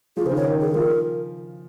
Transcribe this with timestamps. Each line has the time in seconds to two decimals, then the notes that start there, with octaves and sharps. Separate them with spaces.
0.17 F3 G#4
0.25 C#3 C5
0.31 D#3
0.36 C#5
0.45 D#3
0.61 G#4
0.69 D#3
0.74 F3 A#4